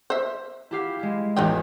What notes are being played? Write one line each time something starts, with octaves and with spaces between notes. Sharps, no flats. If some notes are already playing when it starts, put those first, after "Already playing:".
C5 E5
E4 G4 F5
G#3 E4
A1 E2 F#3 D#4 G4